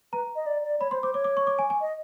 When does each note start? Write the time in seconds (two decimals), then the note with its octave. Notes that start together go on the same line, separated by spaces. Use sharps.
0.13 B4 A#5
0.35 D#5
0.46 D5
0.64 D5
0.80 C#5 B5
0.91 C5 C6
1.03 C5 D6
1.14 C#5 D6
1.24 D6
1.37 C#6
1.47 D6
1.59 G#5
1.70 G#5
1.81 D#5